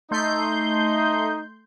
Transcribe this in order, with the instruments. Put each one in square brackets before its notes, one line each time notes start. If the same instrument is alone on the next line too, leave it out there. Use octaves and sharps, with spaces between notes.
[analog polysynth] A3 C6 G6 [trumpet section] D#4